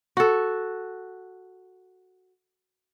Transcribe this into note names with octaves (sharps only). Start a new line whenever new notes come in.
F#4 A4